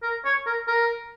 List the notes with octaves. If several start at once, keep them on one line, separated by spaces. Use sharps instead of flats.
A#4
C#5
A#4
A#4